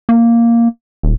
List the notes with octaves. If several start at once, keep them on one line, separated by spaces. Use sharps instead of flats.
A#3
D#1